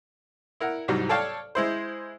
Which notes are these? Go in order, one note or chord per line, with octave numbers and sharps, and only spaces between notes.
E4 A#4 F#5
C2 G#2 F#3 G3
A4 C#5 D5 F5 G5 A5
G#3 E4 C5